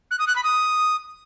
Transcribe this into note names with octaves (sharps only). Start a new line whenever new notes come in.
F#6
D#6
F#6
B5
D#6